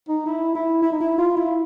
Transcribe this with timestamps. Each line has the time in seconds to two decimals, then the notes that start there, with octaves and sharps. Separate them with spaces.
0.08 D#4
0.26 E4
0.55 E4
0.82 E4
0.92 D#4
1.00 E4
1.18 F4
1.37 E4